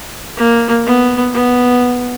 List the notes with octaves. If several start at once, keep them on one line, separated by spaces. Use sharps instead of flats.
A#3
B3
B3